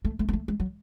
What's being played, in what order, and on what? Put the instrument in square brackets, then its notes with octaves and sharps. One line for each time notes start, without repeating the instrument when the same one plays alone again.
[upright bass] A3
A3
A#3
A3
G#3
F#3